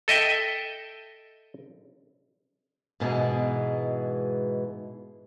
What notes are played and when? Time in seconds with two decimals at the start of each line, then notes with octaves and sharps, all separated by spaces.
0.08 A4 D#5 E5 G5
3.00 G#2 B2 E3 G#3